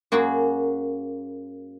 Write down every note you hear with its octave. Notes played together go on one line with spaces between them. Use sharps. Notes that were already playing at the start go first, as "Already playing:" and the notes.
F#2 A#3 F#4 G#4